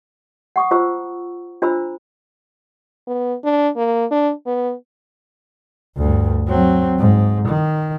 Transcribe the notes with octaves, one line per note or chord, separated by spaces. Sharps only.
F#5 C#6 D#6
F4 C5 A#5 C#6 E6
D4 F4 C5 A#5 B5 E6
B3
D4
A#3
D4
B3
D2 G2
F#3 C4
G#2
D#3